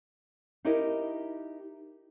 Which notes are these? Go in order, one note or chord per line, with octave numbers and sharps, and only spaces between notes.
D#4 E4 G4 A#4 D#5